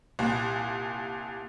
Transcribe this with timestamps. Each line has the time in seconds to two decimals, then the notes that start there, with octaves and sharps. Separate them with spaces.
0.19 C2 A#2